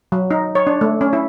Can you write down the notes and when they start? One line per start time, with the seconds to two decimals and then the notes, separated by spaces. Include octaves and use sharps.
0.12 F#3
0.31 D#4
0.55 C#5
0.67 D4
0.81 A3
1.01 C#4
1.13 E4